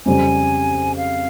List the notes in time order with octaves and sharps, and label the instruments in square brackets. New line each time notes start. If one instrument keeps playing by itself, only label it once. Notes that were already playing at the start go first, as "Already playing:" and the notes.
[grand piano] F2 C#3 G3 C4 [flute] G#5
[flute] F5